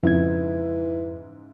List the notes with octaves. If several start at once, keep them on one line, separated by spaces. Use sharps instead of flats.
F2 G#2 C#3 E3 E4 G#6